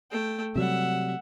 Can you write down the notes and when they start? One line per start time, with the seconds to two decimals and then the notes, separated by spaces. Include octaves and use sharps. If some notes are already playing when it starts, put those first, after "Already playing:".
0.11 A3 G5
0.56 C3 F#3 G3 E5 F#5